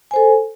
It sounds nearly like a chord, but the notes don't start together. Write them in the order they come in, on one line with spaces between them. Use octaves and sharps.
G#5 C5 A4